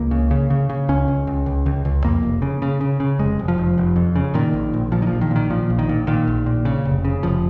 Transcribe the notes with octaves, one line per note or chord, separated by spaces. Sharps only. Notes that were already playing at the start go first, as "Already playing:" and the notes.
Already playing: C#2 A#3
C#3
C#3
C#3
C#3
C#2 C#4
C#2
C#2
C#2
C#2
C#2
F2 A#3
F1
C#3
C#3
C#3
C#3
F1 G#3
F1
F3
F1
F1
F2
C#3
A#2 D#3
A#1
A#1
A#2 F3
D#3
A#1 F3
D#3
A#2
D#3
A#2 F3
A#1
D#3
A#2
A#2 D#3
A#1
A#2
C#3
F1
C#3
F1 F3